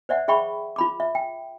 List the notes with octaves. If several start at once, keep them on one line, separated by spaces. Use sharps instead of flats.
C5 D5 E5 F#5
G#4 E5 G5 B5 C#6
F4 B5 D6
E5
G5